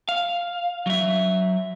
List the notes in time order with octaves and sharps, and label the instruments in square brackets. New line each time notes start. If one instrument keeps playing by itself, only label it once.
[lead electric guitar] F5
F#3 E5